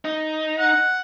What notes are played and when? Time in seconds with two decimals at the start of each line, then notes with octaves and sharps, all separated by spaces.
0.05 D#4
0.60 F#5